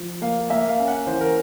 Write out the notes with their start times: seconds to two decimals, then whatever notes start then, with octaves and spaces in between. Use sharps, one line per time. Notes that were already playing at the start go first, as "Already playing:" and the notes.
Already playing: F3
0.22 A#3 F5
0.50 A#3 E5
0.68 F5
0.79 C#4
0.88 F#5
1.07 E3 C5
1.21 A#4